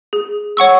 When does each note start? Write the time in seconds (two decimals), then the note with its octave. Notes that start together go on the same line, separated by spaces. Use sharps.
0.13 G#4
0.57 C#5 F#5 C#6 E6